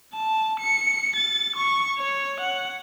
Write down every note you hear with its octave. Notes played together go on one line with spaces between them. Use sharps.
A5
C#7
A6
C#6
C#5
F#5